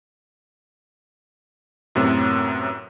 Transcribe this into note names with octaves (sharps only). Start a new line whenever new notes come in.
F#2 A2 C3 B3